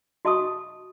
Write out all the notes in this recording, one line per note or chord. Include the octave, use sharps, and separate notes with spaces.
F#4 D#5 A5 C#6 D#6